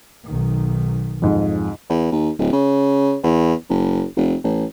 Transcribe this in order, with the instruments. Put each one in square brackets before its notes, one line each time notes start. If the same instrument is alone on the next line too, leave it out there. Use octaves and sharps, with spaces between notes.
[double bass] B1 D#3
[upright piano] F2 G#2 F3
[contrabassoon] E2
D#2
D1
C#3
E2
F#1
F1
A1